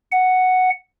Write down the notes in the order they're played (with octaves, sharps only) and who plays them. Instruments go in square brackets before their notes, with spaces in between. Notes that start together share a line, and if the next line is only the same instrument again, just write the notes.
[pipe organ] F#5